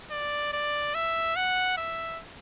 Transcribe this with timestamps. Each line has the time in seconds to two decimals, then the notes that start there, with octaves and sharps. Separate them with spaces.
0.11 D5
0.53 D5
0.94 E5
1.36 F#5
1.77 E5